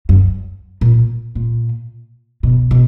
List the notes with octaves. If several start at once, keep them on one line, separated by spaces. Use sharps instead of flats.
F#2
A#2
A#2
B2
B2